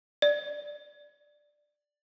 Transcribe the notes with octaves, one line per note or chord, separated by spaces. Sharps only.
D5